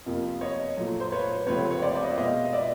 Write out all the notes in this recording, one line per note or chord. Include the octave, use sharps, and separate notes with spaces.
F2 C3 F3 A#3
C#5 D#5
A#2 F#3 A3
C5
B4 C#5
C#2 C3 F3 A3 C4 B4 C#5
C#5
C5 D5
D5
D#5
E5
B2 G#3 B3 D#5 F5
D#5
D5 E5